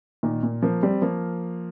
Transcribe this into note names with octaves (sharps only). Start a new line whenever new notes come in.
A#2 D#3
A#2
F3 A#3
G3 C4
F3 A#3